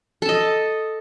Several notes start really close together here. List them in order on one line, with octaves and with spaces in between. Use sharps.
A4 A5 D#5